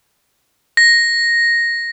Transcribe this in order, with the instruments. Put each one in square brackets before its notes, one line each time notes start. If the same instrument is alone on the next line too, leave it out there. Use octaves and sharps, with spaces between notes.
[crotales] A#6